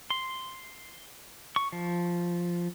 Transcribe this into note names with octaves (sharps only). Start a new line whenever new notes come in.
C6
C#6
F3